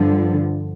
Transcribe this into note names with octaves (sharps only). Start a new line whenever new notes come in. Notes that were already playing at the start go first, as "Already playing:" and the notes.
Already playing: G2 D3 F3